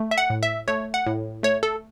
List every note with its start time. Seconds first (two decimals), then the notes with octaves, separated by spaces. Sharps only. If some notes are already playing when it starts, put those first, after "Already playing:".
Already playing: A3
0.11 E5
0.18 F#5
0.30 A2
0.43 E5
0.68 A3 C#5
0.94 F#5
1.07 A2
1.43 A3 C#5
1.63 A4